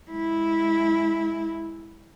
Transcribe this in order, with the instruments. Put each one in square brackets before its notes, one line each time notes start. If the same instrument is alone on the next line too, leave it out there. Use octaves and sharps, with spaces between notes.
[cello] G#3 E4